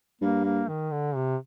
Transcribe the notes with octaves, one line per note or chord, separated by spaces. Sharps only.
G2 A#3
A#3
D#3
D3
C3